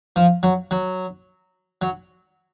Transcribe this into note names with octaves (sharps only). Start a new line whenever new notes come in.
F3
F#3
F#3
F#3